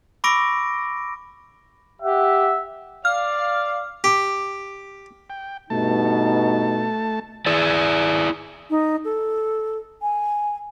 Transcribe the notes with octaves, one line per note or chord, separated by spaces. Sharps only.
B5 C#6 D6 E6 A#6 D7
G4 E5 F#5
D5 F5 F6
G4
G5
G2 B2 A3 D#4 A5
E4 G#4 D5
D#4
A4
G#5